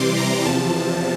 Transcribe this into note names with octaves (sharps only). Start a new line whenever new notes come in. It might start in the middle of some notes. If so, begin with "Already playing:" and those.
Already playing: C3 E3 G3 C6 D6
A#5
E2 C3 F3 A5